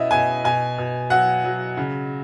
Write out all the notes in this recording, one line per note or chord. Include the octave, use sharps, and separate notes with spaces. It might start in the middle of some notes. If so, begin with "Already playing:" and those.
Already playing: B2 C#4 E4 D#5 E5
B2 G#5
B2 G#5
B2
F#3 F#5
F#3
C#3